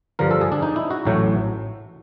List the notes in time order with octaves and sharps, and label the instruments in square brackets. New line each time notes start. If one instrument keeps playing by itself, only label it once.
[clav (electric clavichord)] G2 D3 F3 A#4
A4
G#4
D4
D#4
E4
F#4
A1 A2 F#3 A3